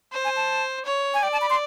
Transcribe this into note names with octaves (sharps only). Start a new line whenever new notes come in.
C5
G#5
A5
C#5
G#5
D5 G5
A5
B5
C6